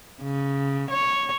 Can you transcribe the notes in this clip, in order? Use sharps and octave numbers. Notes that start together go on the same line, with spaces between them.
C#3
C#5